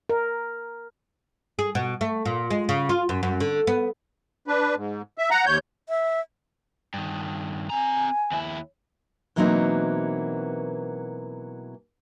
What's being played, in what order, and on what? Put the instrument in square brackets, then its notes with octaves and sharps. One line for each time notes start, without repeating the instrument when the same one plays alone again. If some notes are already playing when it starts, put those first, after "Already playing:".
[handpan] A#4
[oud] G#4
B2
A3
A#2
G#3
C#3
F4
F#2
F#2
D3
B3
[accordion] D4 B4
G#2
E5
F#5 A#5
D#2 C#5 G6
[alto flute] E5
[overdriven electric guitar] G2 D#3
[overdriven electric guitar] C4 A#5 [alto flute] G#5
[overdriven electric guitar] D#2 E4
[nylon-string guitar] B2 E3 F#3 A#3 C4 D#4